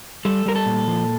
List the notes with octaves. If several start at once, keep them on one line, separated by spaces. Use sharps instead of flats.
G3 A4
G3 A#4
A4
A#2
F3